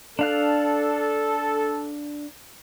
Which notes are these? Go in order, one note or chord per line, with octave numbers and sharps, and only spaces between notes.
D4 A4 F5 F#6